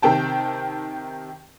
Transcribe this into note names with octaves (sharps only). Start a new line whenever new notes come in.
C3 D#3 G5 A5